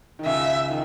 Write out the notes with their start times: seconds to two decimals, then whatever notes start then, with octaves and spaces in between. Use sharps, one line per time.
0.19 D#3
0.26 C#2 C#3 E5
0.69 D#3